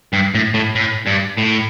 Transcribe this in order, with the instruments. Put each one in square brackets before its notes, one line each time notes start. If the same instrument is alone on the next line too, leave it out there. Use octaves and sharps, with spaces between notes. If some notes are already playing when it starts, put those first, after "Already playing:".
[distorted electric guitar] G2
A2
A2
A2
G2
A2